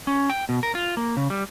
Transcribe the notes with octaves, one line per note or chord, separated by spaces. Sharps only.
C#4
G5
B2
A#4
F4
A#3
C#3
G3